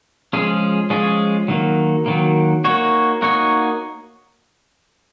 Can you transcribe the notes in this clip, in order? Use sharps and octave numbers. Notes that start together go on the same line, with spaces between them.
F3 G#3 C#4 F4 G#4
F3 G#3 C#4 F4 G#4
D#3 F#3 A#3
D#3 F#3 A#3
A#3 D#4 F#4 C#5
A#3 D#4 F#4 C#5